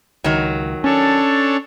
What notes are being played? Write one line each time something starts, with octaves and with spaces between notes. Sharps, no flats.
C#2 D#3 F#3
C#4 D4 A4 C#5